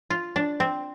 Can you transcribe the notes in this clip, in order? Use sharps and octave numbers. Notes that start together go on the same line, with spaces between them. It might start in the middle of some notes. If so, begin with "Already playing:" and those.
F4
D4
C4